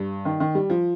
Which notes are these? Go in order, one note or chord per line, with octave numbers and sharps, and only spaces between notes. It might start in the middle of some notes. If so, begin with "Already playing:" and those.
Already playing: G2
D#3
D#3
G3
F3